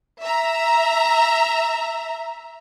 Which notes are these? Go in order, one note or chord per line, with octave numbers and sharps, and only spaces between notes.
E5 A#5